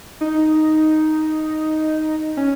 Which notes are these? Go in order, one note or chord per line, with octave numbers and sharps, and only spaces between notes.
D#4
C#4